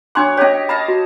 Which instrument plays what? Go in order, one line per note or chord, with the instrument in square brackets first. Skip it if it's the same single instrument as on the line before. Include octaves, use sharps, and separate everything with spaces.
[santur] F#3 C#5 F#5 [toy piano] D4 C6 D6
[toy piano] C#4 C#5 [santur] G4 D#5
[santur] D#5 F5 A5 [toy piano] B5
[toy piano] F#4